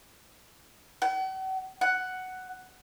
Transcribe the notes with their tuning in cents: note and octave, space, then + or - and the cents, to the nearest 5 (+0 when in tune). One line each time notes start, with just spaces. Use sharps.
F#5 +45
F#5 +5